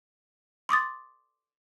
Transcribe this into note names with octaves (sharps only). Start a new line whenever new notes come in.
C6 D6 D#6 A6